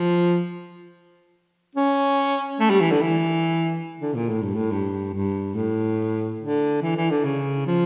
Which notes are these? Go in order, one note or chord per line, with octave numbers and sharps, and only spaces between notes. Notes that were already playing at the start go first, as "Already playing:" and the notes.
Already playing: F3
C#4
A3
G3
E3
D3
E3
D3
A#2
A2
G2
A2
G2
G2
A2
D3
E3
E3
D3
C#3
F3